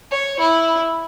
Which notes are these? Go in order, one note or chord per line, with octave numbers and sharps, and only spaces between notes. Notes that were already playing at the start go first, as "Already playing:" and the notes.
C#5
E4